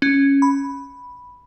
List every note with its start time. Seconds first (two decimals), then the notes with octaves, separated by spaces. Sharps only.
0.02 C#4
0.42 B5